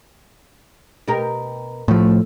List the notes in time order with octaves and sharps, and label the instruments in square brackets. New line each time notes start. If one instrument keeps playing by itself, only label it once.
[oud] B2 G4 A#4
[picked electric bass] A2 F3 [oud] A3